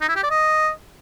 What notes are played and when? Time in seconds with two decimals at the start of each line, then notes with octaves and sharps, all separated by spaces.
0.01 D#4
0.09 E4
0.16 G4
0.23 D5
0.30 D#5